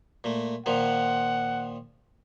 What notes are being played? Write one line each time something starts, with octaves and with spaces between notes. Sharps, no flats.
A#2 A3
A#2 D#3 F3 F#5